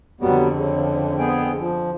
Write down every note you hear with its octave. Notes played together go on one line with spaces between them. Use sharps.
F2 D3 F#3 G3 B3
C#3
B3 G#4 G5
F3